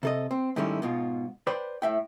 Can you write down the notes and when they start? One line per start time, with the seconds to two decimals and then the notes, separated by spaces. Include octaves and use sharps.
0.03 C3 A4 D#5
0.31 C4
0.56 G#2 D#3 G3 A3 C#4 E4
0.82 G#2 B2 F4
1.47 B4 C5 D5 G5 B5
1.82 A2 E5 G5